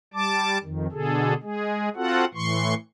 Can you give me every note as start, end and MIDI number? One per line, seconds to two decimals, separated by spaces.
0.14 0.58 55
0.14 0.58 81
0.14 0.58 86
0.63 0.87 41
0.63 0.87 51
0.92 1.34 47
0.92 1.34 50
0.92 1.34 68
0.92 1.34 69
1.43 1.89 56
1.43 1.89 68
1.96 2.25 60
1.96 2.25 65
1.96 2.25 66
1.96 2.25 69
1.96 2.25 78
2.34 2.74 45
2.34 2.74 52
2.34 2.74 84
2.34 2.74 85